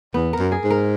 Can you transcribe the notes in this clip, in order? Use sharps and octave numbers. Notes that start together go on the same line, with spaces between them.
E2 B3
A#4
F#2
G#4
G#2
A#4